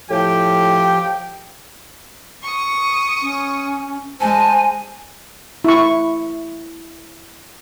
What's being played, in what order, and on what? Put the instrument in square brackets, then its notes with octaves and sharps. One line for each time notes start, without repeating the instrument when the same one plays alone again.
[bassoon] A2 [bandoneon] F3 G4 [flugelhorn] G5
[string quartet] C#6 D#6
[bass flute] C#4
[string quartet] G#3 [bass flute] C5 [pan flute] G#5 [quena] A5
[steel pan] E4 C#6